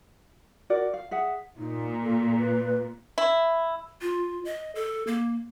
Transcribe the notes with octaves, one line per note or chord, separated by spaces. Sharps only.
F#4 A#4 D5
F5
G#4 E5 F#5
A#2 D#4
A4
B4
E4
F4
D#5
A4
A#3